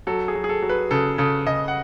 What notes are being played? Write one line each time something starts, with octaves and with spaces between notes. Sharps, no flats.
F#3 A4
G#4
F#3
G#4
A4
F#3
B4
C#3 A4
C#3 A4
C#3 D#5
F#5